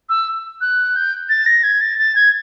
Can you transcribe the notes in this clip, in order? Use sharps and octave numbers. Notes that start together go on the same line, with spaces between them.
E6
F#6
G6
A6
A#6
G#6
A6
A6
G#6